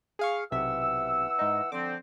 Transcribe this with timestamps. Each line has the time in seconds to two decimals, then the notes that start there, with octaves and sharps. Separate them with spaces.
0.19 G#4 F5 C#6
0.52 B1 C3 E3 E5 F#5 E6
1.39 G#2 D#4
1.72 D3 F3 C4 D6